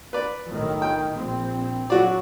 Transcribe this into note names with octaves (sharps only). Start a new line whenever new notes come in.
B4 D5
B1 A2 D#3
G5
A#1 C4
F#3 F#4 D5